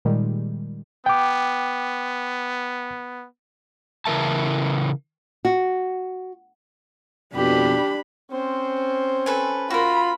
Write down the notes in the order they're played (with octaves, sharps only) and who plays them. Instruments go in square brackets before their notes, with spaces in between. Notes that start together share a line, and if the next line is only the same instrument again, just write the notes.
[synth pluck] A#2 D#3 G3 G#3
[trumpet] B3 [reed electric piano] G5 D6
[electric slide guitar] C#3 E3 A#4 E5 A5
[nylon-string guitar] F#4
[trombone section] F2 B2 [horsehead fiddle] D4 B5 [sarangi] G4
[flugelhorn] C4 [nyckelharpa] C#4 C5
[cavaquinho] A4 B4 G#5
[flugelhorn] F4 [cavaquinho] F#4 A#4 [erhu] B5